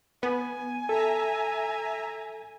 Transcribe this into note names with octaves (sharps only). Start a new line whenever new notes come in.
B3 G#5
A4 E5 A#5